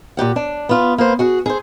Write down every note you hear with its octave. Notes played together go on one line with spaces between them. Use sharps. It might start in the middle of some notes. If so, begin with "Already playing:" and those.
A#2 E3 G4 F#5
D4
B3 F4
A#3 B3 C5
F#4 G#4 F#5
G#4 A4 C5